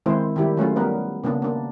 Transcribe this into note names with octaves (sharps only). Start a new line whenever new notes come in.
D#3 G#3 C4 E4 C5
D#3 G3 E4 G4
F#3 A3 C#4 F4
G3 B3 A#4 B4
C#3 A#3 B3 D4
A#3 D4